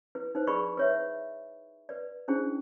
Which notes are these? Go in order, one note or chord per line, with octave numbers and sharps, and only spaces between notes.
E4 B4
D#4 B4 C5
G#4 B4 D5 B5 C#6
B4 C#5 E5
B4 D5
C#4 D4 E4 G#4 C5